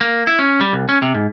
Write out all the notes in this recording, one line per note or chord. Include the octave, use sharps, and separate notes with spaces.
A#3
E4
C#4
G3
C2
C#4
C3
G#2